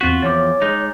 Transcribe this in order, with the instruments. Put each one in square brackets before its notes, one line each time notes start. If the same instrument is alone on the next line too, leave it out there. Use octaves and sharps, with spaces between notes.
[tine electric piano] E2 C4 B6 [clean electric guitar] F4 F#4
[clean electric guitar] E2 F3 [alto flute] C#5 [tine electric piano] D6 A6
[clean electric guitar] G#3 D#4